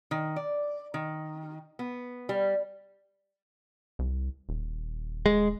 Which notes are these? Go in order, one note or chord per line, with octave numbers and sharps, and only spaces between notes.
D#3
D5
D#3
B3
G3
C2
D#1
G#3